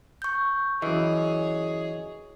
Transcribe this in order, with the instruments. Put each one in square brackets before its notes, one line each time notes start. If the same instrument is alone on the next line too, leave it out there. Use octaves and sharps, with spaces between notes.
[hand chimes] C#6 G6
[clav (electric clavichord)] F#2 E3 [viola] G#4 C#5 [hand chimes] D#5